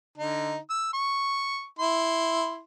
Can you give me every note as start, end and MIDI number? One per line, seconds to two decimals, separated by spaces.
0.18 0.58 50
0.18 0.58 63
0.70 0.92 88
0.93 1.65 85
1.79 2.61 64
1.79 2.61 84